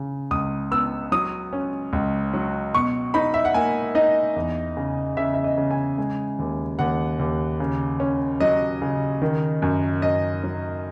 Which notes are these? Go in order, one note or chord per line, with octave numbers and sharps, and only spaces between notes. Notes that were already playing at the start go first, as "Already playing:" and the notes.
Already playing: C#3
C#2 D#6
B3 E6
F#3 D#6
C#4
C#2
F#3
B2 C#6
D#4 B5
E5
F#5
A#3 G#5
D#4 D#5
E2
C#3
C#3 E5
E5
D#5
C#3
G#5
G#3
D#2
D#2 F#5
D#2
C#3
C#4
F#3 D#5
C#3
D#3
F#2
F#2 D#5
F#3